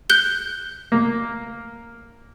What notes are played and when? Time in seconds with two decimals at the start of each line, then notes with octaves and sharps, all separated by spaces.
0.10 F#6 G6 G7
0.92 A#3